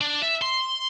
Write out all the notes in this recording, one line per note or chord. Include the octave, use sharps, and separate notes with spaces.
D4
E5
C6